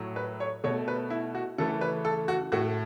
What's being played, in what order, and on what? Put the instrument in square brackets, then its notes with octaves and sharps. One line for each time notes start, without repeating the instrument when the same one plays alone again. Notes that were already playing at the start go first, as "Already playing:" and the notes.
Already playing: [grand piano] A2 F#3 A3
B4
C#5
B2 A3 C#5
B4
E4
F#4
C#3 E3 A3 A4
B4
A4
F#4
A2 A3 F#4